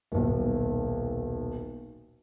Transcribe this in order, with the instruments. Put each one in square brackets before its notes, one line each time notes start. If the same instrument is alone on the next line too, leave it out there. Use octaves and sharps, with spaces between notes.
[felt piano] D#1 B1